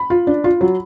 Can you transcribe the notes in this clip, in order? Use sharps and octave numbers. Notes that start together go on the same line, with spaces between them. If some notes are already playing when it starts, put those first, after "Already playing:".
Already playing: B5
F4
D4
F4
F#3